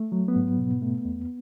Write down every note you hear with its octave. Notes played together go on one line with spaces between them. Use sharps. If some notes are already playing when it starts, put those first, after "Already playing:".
Already playing: A3
F#3
B3
G#2
B2
A3
E2